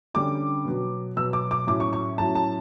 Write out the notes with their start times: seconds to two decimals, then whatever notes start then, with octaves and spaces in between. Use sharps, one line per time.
0.14 D3 G3 C#4 D6
0.65 B2 F#3 B3
1.16 B2 F#3 B3 E6
1.33 D6
1.51 D6
1.67 A2 F#3 C#4 D6
1.80 C#6
1.93 C#6
2.18 A2 F#3 C#4 A5
2.35 A5